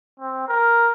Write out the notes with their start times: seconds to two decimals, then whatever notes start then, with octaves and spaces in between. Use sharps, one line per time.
0.20 C4
0.48 A#4